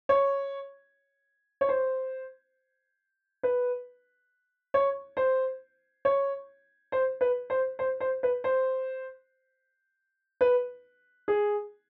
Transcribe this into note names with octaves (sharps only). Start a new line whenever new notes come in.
C#5
C#5
C5
B4
C#5
C5
C#5
C5
B4
C5
C5
C5
B4
C5
B4
G#4